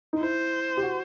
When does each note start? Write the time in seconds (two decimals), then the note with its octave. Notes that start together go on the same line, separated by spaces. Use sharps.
0.13 D#4
0.20 E4 C5
0.77 G4
0.83 F#4